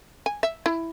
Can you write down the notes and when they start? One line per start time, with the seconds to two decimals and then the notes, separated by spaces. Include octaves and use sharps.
0.26 G#5
0.43 E5
0.66 E4